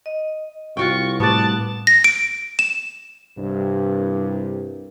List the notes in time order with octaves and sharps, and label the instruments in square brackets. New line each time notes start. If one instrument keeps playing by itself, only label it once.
[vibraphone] D#5
[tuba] C2 [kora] F4 F#4 G5 [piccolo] C#6
[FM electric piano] A2 G3 F#6 [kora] B3 D5 [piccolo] A5
[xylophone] A#6
D7
E7
[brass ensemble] C2 G2